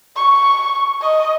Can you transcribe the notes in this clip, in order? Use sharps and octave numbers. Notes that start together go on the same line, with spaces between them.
C#6
D#5